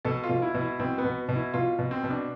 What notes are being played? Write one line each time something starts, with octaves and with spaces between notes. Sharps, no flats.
B2 A4
F4
B2
E4
B2
E4
B2 C4
B3
B2
B2
E4
B2 F4
B2
C4
B2
D4